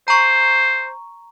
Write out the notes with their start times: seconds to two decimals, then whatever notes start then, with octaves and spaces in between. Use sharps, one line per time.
0.08 C5 A#5 C#6